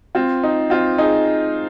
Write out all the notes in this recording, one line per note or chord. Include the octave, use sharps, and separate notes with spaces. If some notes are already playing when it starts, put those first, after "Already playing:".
C4 F4
D#4
C4 F4
D#4 G#4